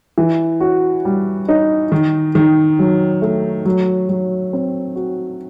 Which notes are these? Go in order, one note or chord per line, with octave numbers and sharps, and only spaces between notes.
E3
F#4
G3
D#4
D#3
D#3
F#3
A3
F#3
F#3
C4
F#4